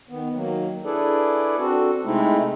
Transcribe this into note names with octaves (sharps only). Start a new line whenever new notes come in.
D#3 B3
D#3 F#3 A#3
D4 E4 G#4 A4 B4 D5
C4 D4 F#4 A4
C3 G#3 A3 C4 D#4 E4